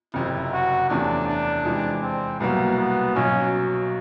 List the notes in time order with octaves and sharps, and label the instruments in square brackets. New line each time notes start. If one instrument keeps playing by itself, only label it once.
[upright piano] F#1 F2 C3 [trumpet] E4
[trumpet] F#4
[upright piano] E2 C3 F3 A3 C#4 [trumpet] D4
[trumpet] D4
[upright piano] F2 C3 E3 G#3
[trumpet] C4
[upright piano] C2 B2 F#3 A#3 [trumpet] B3
[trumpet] B3
[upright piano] B1 B2 F#3 [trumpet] C#4